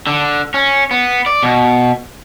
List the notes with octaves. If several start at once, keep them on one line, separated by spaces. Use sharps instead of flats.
D3
C#4
B3
D5
B2